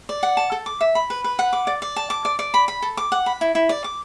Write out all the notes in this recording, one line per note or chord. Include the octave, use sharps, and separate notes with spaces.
D5
F#5
A5
A4
D6
E5
B5
B4
B4
F#5
D6
D5
D5
A5
D6
D5
D5
B5
B5
A4
D6
F#5
B5
E4
E4
D5
D6